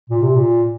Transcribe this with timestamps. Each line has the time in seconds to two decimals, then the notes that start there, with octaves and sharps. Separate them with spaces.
0.10 A#2
0.22 C3
0.36 A#2